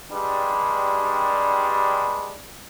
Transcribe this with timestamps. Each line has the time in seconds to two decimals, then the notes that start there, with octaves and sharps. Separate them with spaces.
0.11 G2 G3 G#3 D4